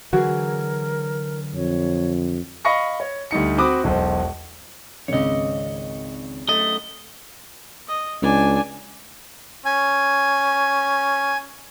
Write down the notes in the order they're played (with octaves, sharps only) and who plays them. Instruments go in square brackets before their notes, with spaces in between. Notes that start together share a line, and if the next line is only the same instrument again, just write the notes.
[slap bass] D3 E3 F#3 [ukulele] F#4 G#4 [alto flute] A#4
[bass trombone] F2 [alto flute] C#5
[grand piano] D#5 F5 B5 C#6 A#6 C#7
C#5
D2 G3 D#4 C#7
C4 F#4 B5 D6 D#6
E1 B1 C5
[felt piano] G#1 C#2 [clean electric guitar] C#5 D#5
[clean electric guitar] F#2 A3 [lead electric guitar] D#5
[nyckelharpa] D#5
[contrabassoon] C#2 [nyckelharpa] D4 G#5
[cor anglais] C#4 [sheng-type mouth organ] G#5